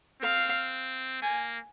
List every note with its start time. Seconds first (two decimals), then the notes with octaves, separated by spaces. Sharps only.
0.22 C4 F5
1.22 A#3 G#5